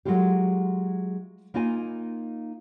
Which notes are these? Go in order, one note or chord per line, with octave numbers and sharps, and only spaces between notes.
F#3 G#3 A3 F4 G4
A#3 D#4 F4 G#5